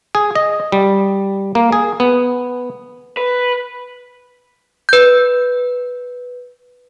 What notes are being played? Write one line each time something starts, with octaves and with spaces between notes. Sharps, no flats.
G#4
D#5
G3
A#3
G#4
B3
B4
B4 G6